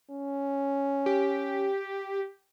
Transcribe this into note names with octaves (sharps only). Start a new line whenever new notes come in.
C#4
G4